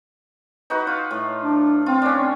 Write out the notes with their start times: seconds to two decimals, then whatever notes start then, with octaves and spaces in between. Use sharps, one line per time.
0.70 D#4 F#4 B4
0.87 F4
1.11 A2
1.44 D4
1.86 C4 F4
2.02 C#4 D4